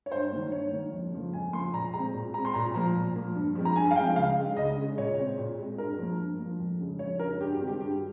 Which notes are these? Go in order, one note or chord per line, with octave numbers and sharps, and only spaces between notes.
C#5
G2 C5
D#3 A#3
G2 C#5
D#3 A#3
F2
C#3 F3 A#3
F2 G#5
C#3 F3 A#3 C6
A#2 A#5
G#3 C4 A#5
A#2
G#3 C4 A#5
C6
A#2 A#5
F3 A#3 A#5
A#2
F3 A#3
G2
F3 G#3 C4
A#5
G2 G#5
F5
F3 G#3 C4 G5
C#2 F5
C#3 G#3
C#2 D#5
C#3 G#3
A#2 C#5
G#3 C4
A#2
G#3 C4
G2 A#4
F3 A#3
G2
F3 A#3
F2
C#3 G#3
F2 C#5
C#3 G#3 A#4
G2 G4
G4
D#3 G#3 C4
G4
G2 G4